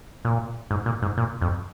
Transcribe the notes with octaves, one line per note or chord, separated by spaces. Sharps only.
A#2
G#2
A#2
G#2
A#2
F2